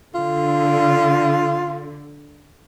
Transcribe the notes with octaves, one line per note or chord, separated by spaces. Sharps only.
D3 F4